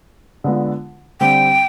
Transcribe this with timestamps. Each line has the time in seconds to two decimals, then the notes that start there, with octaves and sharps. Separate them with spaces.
0.44 D3 G#3 B3 D4 F4
1.20 D3 G3 C4 G5